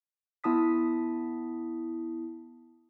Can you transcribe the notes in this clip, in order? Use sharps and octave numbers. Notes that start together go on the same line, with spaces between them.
B3 E4 A5 D#6 B6